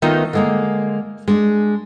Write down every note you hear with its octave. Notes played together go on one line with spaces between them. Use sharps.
D#3 A3 B3 D#4 F4
D3 G#3 A#3
G#3 D4